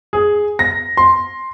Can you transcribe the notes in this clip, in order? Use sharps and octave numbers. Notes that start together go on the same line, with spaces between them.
G#4
A#6
C6